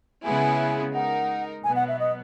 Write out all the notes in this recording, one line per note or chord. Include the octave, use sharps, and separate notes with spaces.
C#3 G#3 B3 E4 G#4 G#5
G#3 D#4 A#4 F#5
B2 F#3 B3 G#5
F#5
E5
D#5